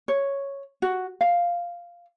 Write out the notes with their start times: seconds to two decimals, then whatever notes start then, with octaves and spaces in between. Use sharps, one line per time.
0.08 C#5
0.82 F#4
1.21 F5